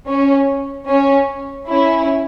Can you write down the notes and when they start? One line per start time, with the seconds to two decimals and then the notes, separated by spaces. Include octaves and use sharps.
0.08 C#4
0.88 C#4
1.68 C#4 E4